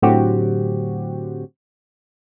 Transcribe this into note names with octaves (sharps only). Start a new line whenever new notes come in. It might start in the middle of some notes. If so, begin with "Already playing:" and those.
A2 D3 F#3 C4 F#4 G4